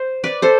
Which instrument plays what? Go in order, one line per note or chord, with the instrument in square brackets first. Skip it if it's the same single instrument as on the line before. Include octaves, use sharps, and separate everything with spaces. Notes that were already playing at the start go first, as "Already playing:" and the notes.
Already playing: [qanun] C5
B4 D5
A4 C5